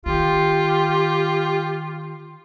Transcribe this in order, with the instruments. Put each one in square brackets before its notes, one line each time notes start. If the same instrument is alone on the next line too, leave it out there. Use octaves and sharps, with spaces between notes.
[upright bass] D#3 [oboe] F4 [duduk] G4